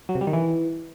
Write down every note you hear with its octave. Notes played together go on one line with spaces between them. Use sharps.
F#3
C3
G3
D#3
E3